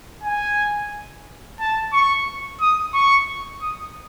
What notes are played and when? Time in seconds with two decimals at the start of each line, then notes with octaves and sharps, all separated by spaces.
0.23 G#5
1.60 A5
1.93 C#6
2.61 D#6
2.94 C#6
3.62 D#6